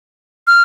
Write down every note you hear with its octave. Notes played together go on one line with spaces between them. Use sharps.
F6